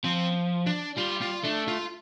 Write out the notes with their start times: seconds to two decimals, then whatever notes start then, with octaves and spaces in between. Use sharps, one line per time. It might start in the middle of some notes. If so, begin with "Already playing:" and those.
0.04 F3 C4
0.67 D4
0.97 G3 F4
1.22 F4
1.44 A3 D4
1.68 F4